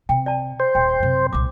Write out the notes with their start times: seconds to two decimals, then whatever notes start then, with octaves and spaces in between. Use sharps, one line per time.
0.09 C3 G5
0.26 D5 A5
0.60 C5
0.75 D#1 G5
1.00 F#2 C3
1.33 C2 A#2 D6